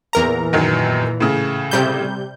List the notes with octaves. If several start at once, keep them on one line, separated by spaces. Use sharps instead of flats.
E2 A#2 E3 A#4 A#5
F#2 D#3 F#3
A2 C#3
C3 G3 G6